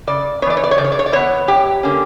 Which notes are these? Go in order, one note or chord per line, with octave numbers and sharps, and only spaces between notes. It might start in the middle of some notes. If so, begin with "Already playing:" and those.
C#3 D5
E3 B3 C#5 D5
C#5
D5
C#5
C#3 D5
C#5
D5
C#5
D5
E3 B3 C#5
F#2 G4
D3 A#3 C#4